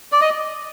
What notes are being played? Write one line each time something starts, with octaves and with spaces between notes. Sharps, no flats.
D5
D#5